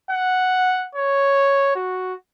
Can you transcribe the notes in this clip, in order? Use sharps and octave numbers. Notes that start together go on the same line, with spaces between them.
F#5
C#5
F#4